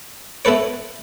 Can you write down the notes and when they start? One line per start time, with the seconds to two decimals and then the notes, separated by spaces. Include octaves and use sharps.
0.45 B3 E4 A4 B4 C#5